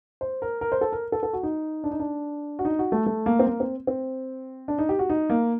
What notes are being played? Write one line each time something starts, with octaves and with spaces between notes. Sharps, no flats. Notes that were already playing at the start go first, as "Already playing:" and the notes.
C5
A#4
A#4
C5
A4
A#4
A4
A4
F#4
D#4
D4
D#4
D4
F#4
D#4
F#4
A3
A3
A#3
C4
A#3
C4
C4
D4
D#4
G4
F#4
D#4
A#3